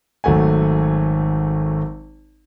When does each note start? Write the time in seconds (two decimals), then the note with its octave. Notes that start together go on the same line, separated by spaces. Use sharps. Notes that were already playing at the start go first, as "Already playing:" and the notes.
0.24 G#1 F#3 A3 F#5 G#5